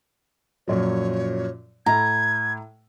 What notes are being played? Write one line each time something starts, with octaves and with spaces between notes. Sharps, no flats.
F#2 A#2 F3 C#5
A2 E4 A#5 G#6